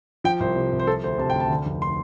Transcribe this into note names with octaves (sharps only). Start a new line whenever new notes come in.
F3 G5
C2 C5
C3
C2
C5
F3 A4
D2 C5
C3 A5
D2 G5
A5
D3
F1
C6